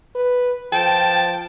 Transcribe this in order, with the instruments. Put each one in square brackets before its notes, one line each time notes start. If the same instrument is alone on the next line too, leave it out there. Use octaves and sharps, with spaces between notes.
[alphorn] B4
[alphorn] F3 [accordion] G5 [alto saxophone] A5